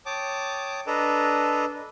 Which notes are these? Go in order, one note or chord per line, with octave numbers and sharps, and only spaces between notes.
C#5 G5 A5 D6 D#6
D4 A4 B4 D#5 A#5